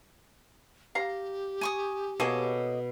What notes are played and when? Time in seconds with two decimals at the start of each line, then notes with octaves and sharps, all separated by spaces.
0.95 G4 F5 A#5
1.61 G#5 C#6 D#6
2.20 B2 A#3 C#4 G#4 A4 D#5 D6